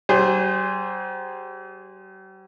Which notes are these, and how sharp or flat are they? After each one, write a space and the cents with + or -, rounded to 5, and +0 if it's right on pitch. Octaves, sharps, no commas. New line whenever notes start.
G3 -45 G#4 -35 C5 +0